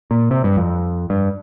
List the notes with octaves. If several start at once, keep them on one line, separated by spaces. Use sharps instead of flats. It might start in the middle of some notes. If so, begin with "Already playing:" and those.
A#2
C3
G2
F2
G2